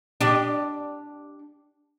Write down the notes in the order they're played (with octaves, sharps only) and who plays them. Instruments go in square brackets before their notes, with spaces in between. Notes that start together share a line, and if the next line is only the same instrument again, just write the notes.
[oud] D4 G4